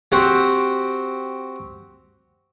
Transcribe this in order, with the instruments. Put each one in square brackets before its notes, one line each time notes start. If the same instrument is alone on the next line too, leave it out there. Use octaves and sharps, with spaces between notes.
[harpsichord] C4 F#4 G4